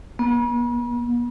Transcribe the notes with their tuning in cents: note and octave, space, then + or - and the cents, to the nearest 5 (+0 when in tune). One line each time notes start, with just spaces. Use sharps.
B3 -45